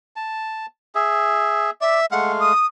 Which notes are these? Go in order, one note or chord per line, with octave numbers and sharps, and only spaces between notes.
A5
G#4 E5
D5 E5
G#3 A3 F5 F#5
D#6